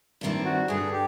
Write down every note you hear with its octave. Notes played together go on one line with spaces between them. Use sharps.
G2 D#3 G3 C4 E4
F#4
G2 D3 G3 G#4
G4